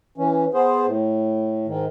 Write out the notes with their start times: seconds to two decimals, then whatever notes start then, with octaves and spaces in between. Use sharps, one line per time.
0.18 E3 C#4
0.54 B3 G#4 C5
0.86 A2
1.67 G#2 D#3